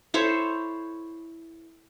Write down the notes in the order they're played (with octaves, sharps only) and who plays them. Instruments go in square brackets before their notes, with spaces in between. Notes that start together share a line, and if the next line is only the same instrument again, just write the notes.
[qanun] E4 A4 C5 C#5